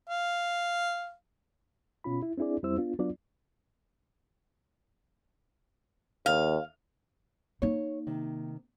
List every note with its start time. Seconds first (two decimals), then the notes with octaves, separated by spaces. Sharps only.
0.10 F5
2.04 B2 C#4 F4 B5
2.23 E4
2.38 C4 D4 E4 G#4 D5
2.63 F2 G3 C4 E4 C5 E6
2.77 B3 D4 F4
2.99 F#3 B3 D4 F4 D5
6.26 D#2 F5
7.62 A#3 D#4 C#5
8.07 C3 D#3